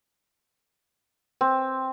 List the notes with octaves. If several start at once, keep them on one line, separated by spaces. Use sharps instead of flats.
C4